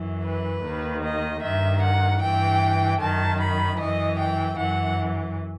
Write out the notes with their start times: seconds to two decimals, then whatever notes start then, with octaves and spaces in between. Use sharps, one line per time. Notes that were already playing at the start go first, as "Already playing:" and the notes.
Already playing: F#2 E3
0.24 B4
0.63 D#2 D#3
1.03 D#5
1.42 G2 D#3 E5
1.81 F#5
2.21 G2 E3 G5
3.00 F#2 D#3 A5
3.39 B5
3.79 F#2 E3 D#5
4.19 G5
4.58 F#2 E3 F#5